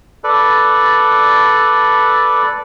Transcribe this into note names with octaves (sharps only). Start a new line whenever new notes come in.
A4 B4 D5